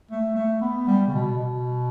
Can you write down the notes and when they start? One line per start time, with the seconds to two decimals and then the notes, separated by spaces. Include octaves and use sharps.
0.11 A3
0.36 A3
0.61 B3
0.87 G3
1.08 C#3
1.14 B2
1.38 B2